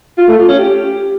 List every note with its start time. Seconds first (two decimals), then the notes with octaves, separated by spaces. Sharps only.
0.18 F4
0.28 A3
0.38 F4
0.48 C#4
0.59 G4